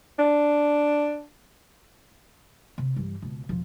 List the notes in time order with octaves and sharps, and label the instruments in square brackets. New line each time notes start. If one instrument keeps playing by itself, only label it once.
[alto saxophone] D4
[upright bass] C3
G2 E3
C#2 B2
E1 F3